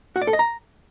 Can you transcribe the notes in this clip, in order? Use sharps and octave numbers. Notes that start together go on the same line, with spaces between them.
F#4
D5
A4
D#5
A#5